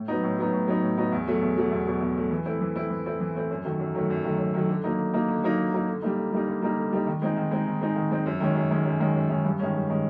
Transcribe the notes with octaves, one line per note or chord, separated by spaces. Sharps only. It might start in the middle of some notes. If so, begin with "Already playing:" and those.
Already playing: A2
F#3 B3 D#4
A2
F#3 B3 D#4
A2
F#3 B3 D#4
A2
F#3 B3 D#4
E2
B2 F#3 A3
E2
B2 F#3 A3
E2
B2 F#3 A3
E2
B2 F#3 A3
E3
A3 C4 E4
E3
A3 C4 E4
E3
A3 C4 E4
E3
A3 C4 E4
F#2
D#3 F#3 A3
F#2
D#3 F#3 A3
F#2
D#3 F#3 A3
F#2
D#3 F#3 A3
D3
F#3 A#3 D#4
D3
F#3 A#3 D#4
D3
F#3 A#3 D#4
D3
F#3 A#3 D#4
D3
G3 A#3 D#4
D3
G3 A#3 D#4
D3
G3 A#3 D#4
D3
G3 A#3 D#4
D#3
G#3 C4 D#4
D#3
G#3 C4 D#4
D#3
G#3 C4 D#4
D#3
G#3 C4 D#4
F#2
D#3 G#3 C#4
F#2
D#3 G#3 C#4
F#2
D#3 G#3 C#4
F#2
D#3 G#3 C#4
G2
D#3 G#3 C#4
G2
D#3 G#3 C#4